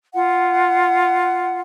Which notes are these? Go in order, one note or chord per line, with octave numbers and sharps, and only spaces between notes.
F4 F#5